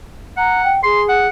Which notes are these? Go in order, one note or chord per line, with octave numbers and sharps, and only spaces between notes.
F#5 A#5
G5
G#4 C6
F#5